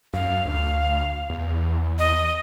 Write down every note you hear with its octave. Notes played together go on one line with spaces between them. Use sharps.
F#2 F5
D2
E2
D#5